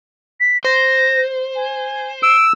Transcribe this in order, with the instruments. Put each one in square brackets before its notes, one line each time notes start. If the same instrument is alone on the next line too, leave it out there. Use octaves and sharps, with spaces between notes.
[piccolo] B6
[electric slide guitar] C5 [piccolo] A#6
[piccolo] G#5
[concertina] E6 [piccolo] D7